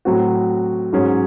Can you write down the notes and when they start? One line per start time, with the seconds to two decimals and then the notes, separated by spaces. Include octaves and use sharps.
0.05 A2 F#3 C4 F#4
0.92 G#2 F#3 C#4 G#4